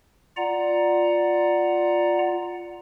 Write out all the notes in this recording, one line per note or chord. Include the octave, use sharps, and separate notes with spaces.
F4 D5 F#5 A#5